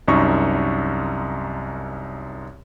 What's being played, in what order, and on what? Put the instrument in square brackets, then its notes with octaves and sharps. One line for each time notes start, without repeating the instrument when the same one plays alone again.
[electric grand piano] C2 F#2 D#4 C#6